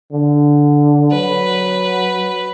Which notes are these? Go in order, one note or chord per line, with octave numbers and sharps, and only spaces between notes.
D3
F#3 B4